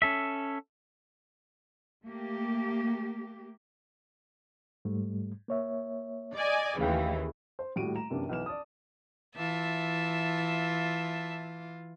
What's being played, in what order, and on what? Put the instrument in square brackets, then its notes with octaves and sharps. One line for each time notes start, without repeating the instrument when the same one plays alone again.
[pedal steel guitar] C#4 A4 E5
[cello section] A3 A#3 G4
[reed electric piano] G#2 G3 A3
A#3 C#5 E5
[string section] D5 D#5 G#5
[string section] D#2 C#3 E3 [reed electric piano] A3 F5 G5
[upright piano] C5
D#1 A2 G3 F#4 D7 D#7
A#5 E7
F#2 C3 E3 A#3 D4
B1 E3 F6 E7
D5 A5 D#6
[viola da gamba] E3 F4 [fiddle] E5 A5